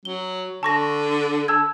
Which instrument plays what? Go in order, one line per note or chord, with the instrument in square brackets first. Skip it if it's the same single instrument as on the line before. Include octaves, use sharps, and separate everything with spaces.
[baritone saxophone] F#3 [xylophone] G7
[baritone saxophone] D3 [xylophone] A5 C#6 A#6
[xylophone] A5 E6 G#6